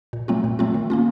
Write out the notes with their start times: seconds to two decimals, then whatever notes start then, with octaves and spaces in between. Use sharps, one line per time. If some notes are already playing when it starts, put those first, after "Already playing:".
0.13 A#2
0.28 F#3 A3 C4 F4
0.44 A#2
0.59 F#3 A3 C4 F4
0.74 D#3
0.90 A#3 C#4 F4